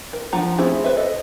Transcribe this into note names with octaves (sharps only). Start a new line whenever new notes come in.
A#4
F3 D4 F4 F#5 A#5
A3 C4 C#4 E4 G#4
B4 C5 E5
A4 D#5